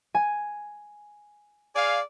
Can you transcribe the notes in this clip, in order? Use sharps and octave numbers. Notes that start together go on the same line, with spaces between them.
G#5
G#4 D5 F5